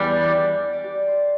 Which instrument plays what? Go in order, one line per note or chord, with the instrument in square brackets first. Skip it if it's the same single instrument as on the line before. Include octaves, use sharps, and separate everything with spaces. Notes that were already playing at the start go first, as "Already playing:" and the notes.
Already playing: [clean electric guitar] E2 E3 G3 D4 [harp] D5
[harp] D5
G4
C5